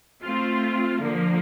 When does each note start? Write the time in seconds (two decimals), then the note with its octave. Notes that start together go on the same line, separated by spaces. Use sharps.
0.23 A3 C4 F4
1.01 D3 F3 A#3